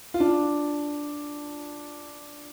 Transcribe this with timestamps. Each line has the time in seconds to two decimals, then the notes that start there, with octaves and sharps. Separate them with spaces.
0.14 F4
0.20 D4